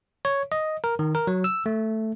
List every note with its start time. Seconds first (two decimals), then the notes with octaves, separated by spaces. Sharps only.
0.25 C#5
0.52 D#5
0.84 A#4
0.99 D#3
1.15 A#4
1.27 F#3
1.44 E6
1.66 A3